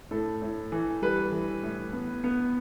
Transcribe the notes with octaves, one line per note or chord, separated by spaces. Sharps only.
A2 A4
A2
E3
G3 B4
E3
A2
B3
B3